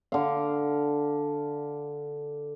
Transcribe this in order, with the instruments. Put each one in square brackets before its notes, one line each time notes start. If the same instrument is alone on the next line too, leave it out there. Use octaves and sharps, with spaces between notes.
[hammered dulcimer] D3 F5